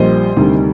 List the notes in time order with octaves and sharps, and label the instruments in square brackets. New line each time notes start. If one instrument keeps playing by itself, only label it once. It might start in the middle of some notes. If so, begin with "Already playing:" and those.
Already playing: [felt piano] A#1 A#2 G3 C5 D#5
D2 C3 D#3 G3